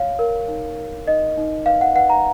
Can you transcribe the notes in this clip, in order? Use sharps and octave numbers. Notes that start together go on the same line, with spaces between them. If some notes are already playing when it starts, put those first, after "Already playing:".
Already playing: C#5 F5
A#4
D#4
A#4
D#4 D#5
D#4
B4 F5
F#5
B4 F#5
A#5